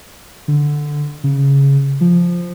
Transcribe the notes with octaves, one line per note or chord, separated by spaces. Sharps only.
D3
C#3
F3